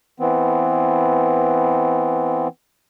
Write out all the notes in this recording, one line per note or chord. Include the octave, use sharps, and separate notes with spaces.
E3 B3 C4